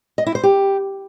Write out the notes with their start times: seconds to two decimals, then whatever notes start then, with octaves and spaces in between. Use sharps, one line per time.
0.18 D#5
0.26 E4
0.35 C5
0.43 G4